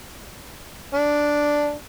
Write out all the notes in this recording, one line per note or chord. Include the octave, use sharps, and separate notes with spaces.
D4